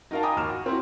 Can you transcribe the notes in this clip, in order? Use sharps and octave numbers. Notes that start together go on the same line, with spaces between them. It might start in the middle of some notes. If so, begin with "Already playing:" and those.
D#4 F#4 A#4 F5 A5
G5 G#5 A#5 B5 D6 D#6
D#2 F6 E7
F#4
C4 E4 F#4